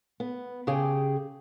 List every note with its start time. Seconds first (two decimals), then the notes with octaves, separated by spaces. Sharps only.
0.20 B3
0.67 C#3 G4 G#4 G5